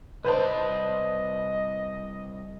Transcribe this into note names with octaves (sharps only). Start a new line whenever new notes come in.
C2 B4 C5 D5 D#5 A5